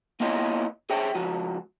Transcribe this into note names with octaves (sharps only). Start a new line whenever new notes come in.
A#3 B3 E4 F4 C#5 D#5
G#4 C5 C#5 E5 G5
C#2 F3 F#4